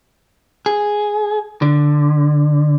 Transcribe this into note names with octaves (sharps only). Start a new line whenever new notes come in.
G#4
D3